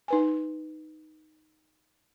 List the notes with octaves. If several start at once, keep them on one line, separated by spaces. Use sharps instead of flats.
D#4 B4 G#5